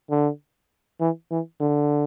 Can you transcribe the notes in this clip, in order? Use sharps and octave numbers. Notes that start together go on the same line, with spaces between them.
D3
E3
E3
D3